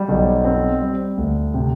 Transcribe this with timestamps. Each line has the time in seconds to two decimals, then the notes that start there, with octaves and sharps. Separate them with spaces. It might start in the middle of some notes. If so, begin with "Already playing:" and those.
Already playing: G3
0.09 B1
0.44 C4
0.80 G3
1.18 D2
1.54 C3